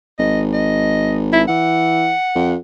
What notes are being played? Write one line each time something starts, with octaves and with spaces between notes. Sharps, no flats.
G#1 D#5
D#5
E4
E3 F#5
F2